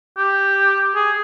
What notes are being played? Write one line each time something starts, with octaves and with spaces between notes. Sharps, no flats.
G4
G#4